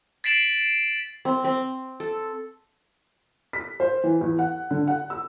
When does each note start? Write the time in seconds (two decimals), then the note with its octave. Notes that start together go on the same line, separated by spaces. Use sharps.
0.24 A6 B6 C7 D7 E7 F#7
1.25 C4
1.44 C4
2.00 A4
3.53 B6
3.80 C5
4.03 E3
4.21 E2
4.39 F#5
4.70 D3
4.88 F#5
5.10 E6